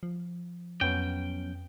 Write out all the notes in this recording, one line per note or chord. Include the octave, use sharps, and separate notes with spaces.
F3
F2 F#3 B3 C#4 G5